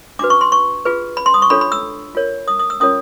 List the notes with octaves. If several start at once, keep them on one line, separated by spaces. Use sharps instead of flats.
D4 F#4 B4 D6
C#6
C6
C#6
F4 G#4 B4
B5
C6
D#6
C#6
D4 F4 A4 C#5 B5
B5
E6
F4 A#4 C#5
D#6
D#6
E6
C#4 F4 A#4 C#5 D#6